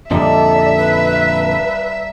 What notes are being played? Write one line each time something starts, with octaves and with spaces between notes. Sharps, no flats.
F2 A#2 D3 G3 D#4 A4 D5 E5
B4
F5